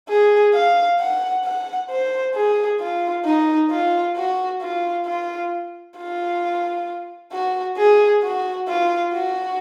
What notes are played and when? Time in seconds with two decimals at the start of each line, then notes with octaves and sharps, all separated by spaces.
0.09 G#4
0.54 F5
1.00 F#5
1.45 F#5
1.90 C5
2.35 G#4
2.80 F4
3.25 D#4
3.71 F4
4.16 F#4
4.61 F4
5.06 F4
5.97 F4
7.32 F#4
7.77 G#4
8.23 F#4
8.68 F4
9.13 F#4